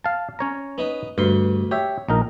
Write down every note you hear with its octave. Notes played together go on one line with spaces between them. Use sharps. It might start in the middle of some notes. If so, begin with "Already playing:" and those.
F5 A5
C#4 C#5 A#5
B3 D#4 B4
D2 G2 B4 C6
G4 C#5 E5
A#1 D#4 A#4